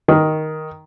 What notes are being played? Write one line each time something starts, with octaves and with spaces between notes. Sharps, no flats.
D#3